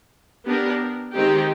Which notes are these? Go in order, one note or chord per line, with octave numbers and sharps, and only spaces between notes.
B3 D4 G4 A#4
D#3 G#3 C4 D#4 G4